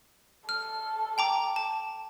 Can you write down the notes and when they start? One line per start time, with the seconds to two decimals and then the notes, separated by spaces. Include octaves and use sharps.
0.49 A4 F6
1.18 G5 A#5 D6
1.56 A5